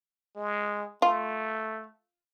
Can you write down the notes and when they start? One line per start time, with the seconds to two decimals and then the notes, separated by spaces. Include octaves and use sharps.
0.36 G#3
1.02 A3 F4